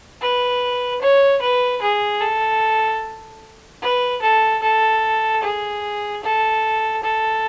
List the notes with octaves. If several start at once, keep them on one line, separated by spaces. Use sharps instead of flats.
B4
C#5
B4
G#4
A4
B4
A4
A4
G#4
A4
A4